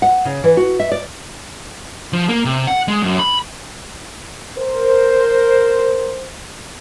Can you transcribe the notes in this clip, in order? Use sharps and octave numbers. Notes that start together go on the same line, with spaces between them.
F#5
C#3
E3
F#4
E5
D5
F3
A#3
C3
F#5
G#3
F#2
B5
A#4 C5